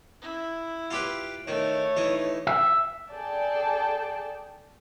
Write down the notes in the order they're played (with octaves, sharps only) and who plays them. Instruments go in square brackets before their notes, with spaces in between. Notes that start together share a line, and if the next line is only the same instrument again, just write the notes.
[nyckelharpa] E4
[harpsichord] F4 G4 B4
[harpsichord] D#3 [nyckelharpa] A3 [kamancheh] C#5
[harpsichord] E3 D#4
[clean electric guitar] E5
[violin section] G#4 A4 D5 G5 A5